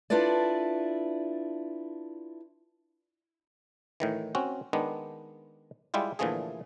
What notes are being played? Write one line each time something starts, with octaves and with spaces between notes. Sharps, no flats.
D4 E4 F4 A4 B4 D5
A2 D#3 E3
C4 C#4 F#4
D#3 G#3 B3 D4
G3 G#3 E4 F4 G4
A#2 D3 E3 F3 A3 G#4